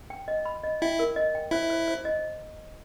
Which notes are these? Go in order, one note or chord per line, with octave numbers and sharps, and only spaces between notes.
G5
D#5
B5
D#5
E4 G5
A#4
D#5
G5
E4 C5
C5
C5
D#5